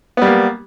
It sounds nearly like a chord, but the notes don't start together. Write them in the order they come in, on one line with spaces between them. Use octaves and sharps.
B3 G3 A#3